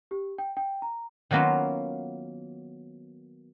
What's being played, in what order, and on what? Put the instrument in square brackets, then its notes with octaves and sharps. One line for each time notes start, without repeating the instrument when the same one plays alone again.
[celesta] G4
G5
G5
A#5
[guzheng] D#3 F#3 A#3 B3 C#4 F4